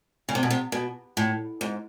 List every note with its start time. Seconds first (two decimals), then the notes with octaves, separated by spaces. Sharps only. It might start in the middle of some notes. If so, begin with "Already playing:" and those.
0.29 C#3
0.35 C3
0.43 B2
0.50 C3
0.72 B2
1.17 A2
1.61 G#2